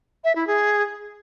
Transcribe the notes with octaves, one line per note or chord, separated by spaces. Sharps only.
E5
E4
G#4